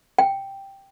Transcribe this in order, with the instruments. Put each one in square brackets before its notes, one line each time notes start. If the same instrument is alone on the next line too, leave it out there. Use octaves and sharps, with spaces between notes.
[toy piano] G5